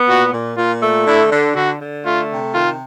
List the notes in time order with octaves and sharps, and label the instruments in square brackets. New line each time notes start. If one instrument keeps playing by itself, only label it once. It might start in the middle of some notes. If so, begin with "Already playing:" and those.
Already playing: [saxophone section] B3
[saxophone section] A#2 [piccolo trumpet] F#4
[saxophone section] A#2
[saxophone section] A#2 [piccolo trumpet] F4
[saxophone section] A3
[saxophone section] D3 [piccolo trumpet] E4
[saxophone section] D3
[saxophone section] D3 [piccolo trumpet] F#4
[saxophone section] D3
[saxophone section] A3 [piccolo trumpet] F4
[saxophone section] C3
[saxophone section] D#3 [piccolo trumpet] F4